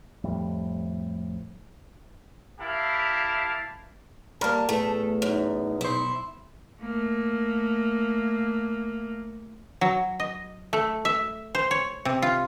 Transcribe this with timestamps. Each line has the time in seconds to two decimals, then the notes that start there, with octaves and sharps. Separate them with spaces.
0.24 F2 A2 G3
2.59 E4 G4 A#4 F5 A5
4.41 G3 A#3 A#4 A5
4.69 E2 A2 A3
5.22 F#2 D#4
5.81 B1 E4 C5
6.81 A3 A#3
9.81 F#3
10.20 D#5
10.73 A3
11.05 E5
11.55 C5
11.71 C#5
12.05 C3
12.22 F4